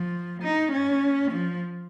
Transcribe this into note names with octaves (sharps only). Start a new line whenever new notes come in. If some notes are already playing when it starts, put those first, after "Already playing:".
Already playing: F3
D#4
C#4
F3